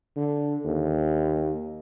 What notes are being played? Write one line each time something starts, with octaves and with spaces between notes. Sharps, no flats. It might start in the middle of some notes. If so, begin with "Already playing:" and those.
D3
D#2